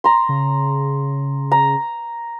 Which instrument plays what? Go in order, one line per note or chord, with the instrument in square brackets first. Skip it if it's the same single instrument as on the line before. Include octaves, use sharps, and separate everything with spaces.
[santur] A#5 C6
[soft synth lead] C#3
[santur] A#5